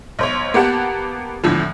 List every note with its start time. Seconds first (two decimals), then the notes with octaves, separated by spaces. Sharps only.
0.19 B1 C5 C#5
0.54 A#3 B3 G4 F#5 A5
1.44 E2 A2 D3 F3